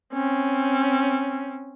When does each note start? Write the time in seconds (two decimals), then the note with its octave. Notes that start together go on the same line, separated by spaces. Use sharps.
0.13 C4 C#4